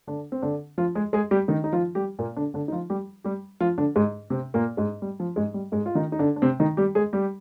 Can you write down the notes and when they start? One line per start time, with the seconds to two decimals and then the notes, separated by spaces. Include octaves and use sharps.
0.07 D3 D4
0.32 C4
0.42 D3 D4
0.78 F3 F4
0.95 G#3 G#4
1.13 G#3 G#4
1.31 G3 G4
1.48 D#3 D#4
1.64 D#4
1.73 F3 F4
1.95 G3 G4
2.19 A#2 A#3
2.36 D3 D4
2.54 D3 D4
2.68 D#4
2.72 F3 F4
2.90 G3 G4
3.24 G3 G4
3.61 F3 F4
3.78 D3 D4
3.96 G#2 G#3
4.30 C3 C4
4.54 A#2 A#3
4.77 G#2 G#3
5.02 G3
5.20 F3
5.36 G#2 G#3
5.54 G3
5.72 G#2 G#3
5.86 F4
5.95 D#3 D#4
6.12 D#4
6.19 D3 D4
6.36 D4
6.42 C3 C4
6.60 D#3 D#4
6.77 G3 G4
6.95 G#3 G#4
7.13 G3 G4